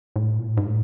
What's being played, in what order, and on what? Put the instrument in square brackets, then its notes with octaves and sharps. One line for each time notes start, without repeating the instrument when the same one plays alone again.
[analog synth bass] A2
A#2
A2
G#2
A2